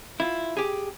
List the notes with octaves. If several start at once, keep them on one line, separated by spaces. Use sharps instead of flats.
E4 F4
G4 G#4